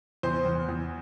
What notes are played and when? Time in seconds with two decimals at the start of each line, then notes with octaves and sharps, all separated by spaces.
0.23 E2 C5
0.45 E2
0.69 E2